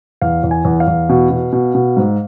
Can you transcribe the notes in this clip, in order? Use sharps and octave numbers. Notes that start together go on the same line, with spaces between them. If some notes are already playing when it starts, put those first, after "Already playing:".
E2 F5
E2
G#5
E2
F5
E2
B2
B2
B2
B2
G#2